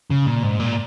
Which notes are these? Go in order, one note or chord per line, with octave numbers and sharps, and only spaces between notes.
C#3
A#2
G#2
A#2